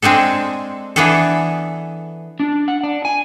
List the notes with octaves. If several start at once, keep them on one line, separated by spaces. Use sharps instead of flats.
G#3 C4 D4 G#4 A4
E3 B3 D4 G#4 A4
D4
F#5
D4
G#5